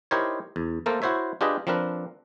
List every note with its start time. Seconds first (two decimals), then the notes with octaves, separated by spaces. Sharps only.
0.11 D#4 E4 G4 A#4 C5 C#5
0.56 E2
0.86 A3 A#3 A4 A#4 C5
1.02 E4 F#4 C5 C#5 E5
1.41 D4 F4 G4 G#4 B4 D#5
1.67 F3 C4 D4 A#4 B4